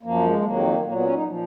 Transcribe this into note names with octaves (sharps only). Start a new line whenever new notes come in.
F#2 F3 A#3
G#3
F2 D#3 F#3 A#3
A#2 F#3 A#3
B3
C#4
D#4
A#2 F3